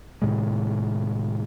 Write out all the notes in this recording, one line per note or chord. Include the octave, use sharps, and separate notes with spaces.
A2 C3 D#3 G#3